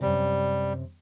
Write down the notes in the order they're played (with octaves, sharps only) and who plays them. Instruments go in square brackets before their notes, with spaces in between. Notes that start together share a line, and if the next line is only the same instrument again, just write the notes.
[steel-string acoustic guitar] F#2 C3 [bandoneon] G3